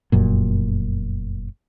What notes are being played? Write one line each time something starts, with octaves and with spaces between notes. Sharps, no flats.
F1 F#2 A#2